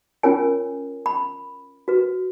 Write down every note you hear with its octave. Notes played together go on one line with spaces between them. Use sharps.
C#4 F4 A#4 C#5 G#5
B5
F#4 B4